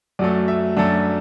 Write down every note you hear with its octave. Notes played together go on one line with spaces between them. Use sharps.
F#2 F#3 A3 D5
E5
F#2 F#3 A3 D4